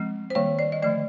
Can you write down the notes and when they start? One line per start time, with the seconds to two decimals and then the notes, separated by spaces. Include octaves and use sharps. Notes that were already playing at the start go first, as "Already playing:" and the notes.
Already playing: F3 G#3 C4
0.30 C5
0.35 D#3 G3 A#3 C#5
0.59 D5
0.72 D#5
0.82 D3 F3 A3 D5